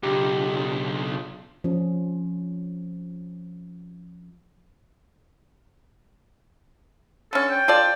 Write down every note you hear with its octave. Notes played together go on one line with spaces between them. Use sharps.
B1 C#3 D4 F4 G4
F3 C#4
D3 C#4 A4
G5
F4 A4 D5